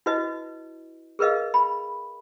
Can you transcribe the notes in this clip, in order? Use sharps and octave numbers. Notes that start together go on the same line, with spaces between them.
E4 F#4 B4 D#5
G#4 A#4 B4 D#5 F5
B5